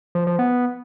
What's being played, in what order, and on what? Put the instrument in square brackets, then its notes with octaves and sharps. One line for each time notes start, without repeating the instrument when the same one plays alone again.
[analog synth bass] F3
F3
B3